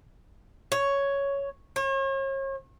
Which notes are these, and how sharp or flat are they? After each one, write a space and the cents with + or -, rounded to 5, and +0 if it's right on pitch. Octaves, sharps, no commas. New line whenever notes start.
C#5 +5
C#5 -40